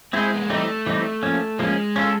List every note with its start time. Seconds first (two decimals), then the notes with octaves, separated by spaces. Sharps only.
0.13 G#3 C4 E4 G#4 C5
0.34 B3
0.42 A#3
0.49 E3 G3 A3 C4 D#4
0.87 E3 G3 C4 D#4
1.23 F3 A#3 C#4
1.59 F3 G#3 A#3 C#4
1.96 C#4 F4 A4